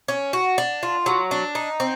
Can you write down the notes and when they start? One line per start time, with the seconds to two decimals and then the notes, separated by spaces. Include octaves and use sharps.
0.08 C#4
0.33 F#4
0.58 D4
0.83 F4
1.06 F#3
1.31 D4
1.55 D#4
1.80 C4